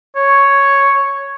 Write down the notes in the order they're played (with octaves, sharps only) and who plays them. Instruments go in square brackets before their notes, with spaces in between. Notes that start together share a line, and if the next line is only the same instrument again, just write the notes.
[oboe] C#5